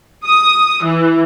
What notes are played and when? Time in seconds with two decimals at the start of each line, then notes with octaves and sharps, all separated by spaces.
0.25 D#6
0.83 E3